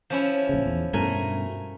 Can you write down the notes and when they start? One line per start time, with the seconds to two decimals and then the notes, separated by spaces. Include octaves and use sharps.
0.10 F3 C#4 E4
0.49 A#1 C#3
0.66 E2
0.93 G2 B2 A3 C#4 A#4 G#5